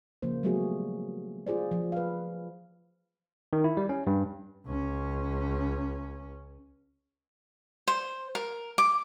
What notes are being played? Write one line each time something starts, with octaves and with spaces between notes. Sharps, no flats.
C#3 F3 A#3 C5
F#3 G3 A3 B3 F#4 G#4
F4 G#4 C5 D5
F3
B4 F5
D#3
E4
G3
C#4
G2
C#2 C#4
C5
A#4
D6